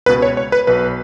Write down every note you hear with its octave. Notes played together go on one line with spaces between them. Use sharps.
C#2 B2 B4
C#5
C#5
B4
B1 B2 B4